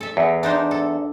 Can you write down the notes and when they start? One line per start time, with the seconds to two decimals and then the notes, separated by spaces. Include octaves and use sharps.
0.01 A4 E5
0.17 E2
0.43 D4 D#4 C5
0.71 A4